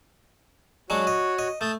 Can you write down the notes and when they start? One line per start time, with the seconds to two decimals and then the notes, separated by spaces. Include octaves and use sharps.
0.90 F#3 G#3 D4 F#4 C#5
1.07 D#5
1.39 D#5
1.61 A3 A5 D#6 G6